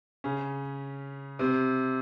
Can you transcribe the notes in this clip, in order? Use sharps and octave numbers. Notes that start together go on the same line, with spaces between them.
C#3 C#4
C3 C4